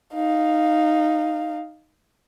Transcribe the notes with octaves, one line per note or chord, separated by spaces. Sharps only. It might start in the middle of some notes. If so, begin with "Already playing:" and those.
D#4 F5